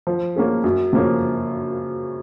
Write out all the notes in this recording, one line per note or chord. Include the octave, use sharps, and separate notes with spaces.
F3
A#3 C#4 G#4
F#2
C#3 F3 A#3 C#4